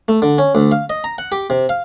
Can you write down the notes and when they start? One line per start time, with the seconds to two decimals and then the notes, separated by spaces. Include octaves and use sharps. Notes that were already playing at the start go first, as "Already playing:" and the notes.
0.08 A3
0.22 D3
0.38 C#4
0.55 D2
0.71 F5
0.90 D#5
1.04 A#5
1.18 F#5
1.32 G4
1.50 C3
1.69 F5